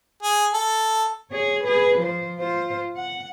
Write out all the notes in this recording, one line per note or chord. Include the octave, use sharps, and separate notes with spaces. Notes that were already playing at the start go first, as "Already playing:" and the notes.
G#4
A4
G#4 C#5
G#4 B4
F3 C5
F4 C5
F#5